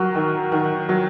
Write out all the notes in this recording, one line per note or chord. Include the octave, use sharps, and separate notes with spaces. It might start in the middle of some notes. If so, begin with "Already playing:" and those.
Already playing: F#3 F#4 A#4
D#3
D#3
F#3